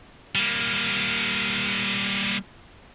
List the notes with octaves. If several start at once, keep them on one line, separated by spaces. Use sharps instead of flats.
G3 A#3